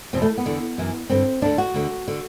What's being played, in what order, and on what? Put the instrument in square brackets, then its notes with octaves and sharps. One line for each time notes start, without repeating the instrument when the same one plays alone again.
[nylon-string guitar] E2 B2 C4
A3
B3
E2 D3
F#2 E3
G2 D3 C4
D2 D3 D4
F#4
D2 D3
D3